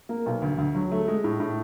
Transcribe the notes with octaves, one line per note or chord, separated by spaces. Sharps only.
A#3
B1
D2
D2
F#3
A3
G#3
A2
A2